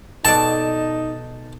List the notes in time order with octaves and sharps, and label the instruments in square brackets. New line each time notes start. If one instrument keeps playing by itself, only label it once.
[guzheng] B2 A4 D5 [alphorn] D#4 [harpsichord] A5